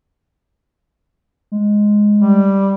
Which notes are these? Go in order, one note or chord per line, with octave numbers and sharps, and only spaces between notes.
G#3
G3